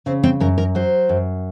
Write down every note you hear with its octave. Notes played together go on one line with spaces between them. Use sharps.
C#3 C4
C4
F#2 A#4
A#4
F#3 C5
F#2